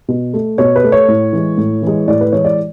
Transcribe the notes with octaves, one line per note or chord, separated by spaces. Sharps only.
B2
A3
B2 C#5
B4
A3
C#5
A2
E3 G#3
A2
E3 G#3
A2 D5
B4
E3 G#3 C#5
D5